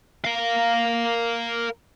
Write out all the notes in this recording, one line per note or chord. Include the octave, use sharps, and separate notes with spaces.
A#4 F5